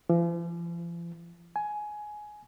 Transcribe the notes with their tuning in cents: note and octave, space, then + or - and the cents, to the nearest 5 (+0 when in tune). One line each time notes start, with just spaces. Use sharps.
F3 -45
G#5 +15